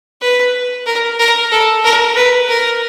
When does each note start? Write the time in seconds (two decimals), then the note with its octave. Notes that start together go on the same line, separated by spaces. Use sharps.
0.21 B4
0.87 A#4
1.19 A#4
1.51 A4
1.84 A#4
2.16 B4
2.48 A#4